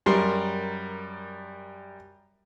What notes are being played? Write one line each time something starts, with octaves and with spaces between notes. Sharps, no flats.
F#2 G3 A#4 C6